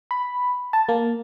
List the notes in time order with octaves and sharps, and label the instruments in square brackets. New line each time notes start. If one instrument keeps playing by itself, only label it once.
[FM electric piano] B5
A5
A#3